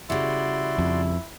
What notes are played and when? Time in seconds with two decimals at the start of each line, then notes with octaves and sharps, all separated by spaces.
0.10 C#3 G3 E4 F#4 D5 C6
0.78 F2